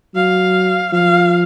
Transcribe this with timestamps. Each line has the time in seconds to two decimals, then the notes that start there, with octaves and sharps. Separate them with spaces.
0.15 F#3 F5
0.92 F3 F5